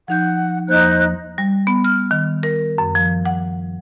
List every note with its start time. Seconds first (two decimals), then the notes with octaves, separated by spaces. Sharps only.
0.08 F3 D#4 F#5 G6
0.68 E2 F3 A#3 D#4 C5 F#6
1.38 G3
1.67 B3
1.84 F6
2.11 D#3
2.43 A#4
2.78 F#2
2.95 F3
3.26 F#5